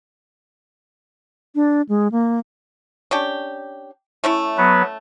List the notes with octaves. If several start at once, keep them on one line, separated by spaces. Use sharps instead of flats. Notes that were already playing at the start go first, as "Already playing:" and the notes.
D4
G#3
A#3
C#4 D4 G4
A3 C#4 E4
F#3 B3 B4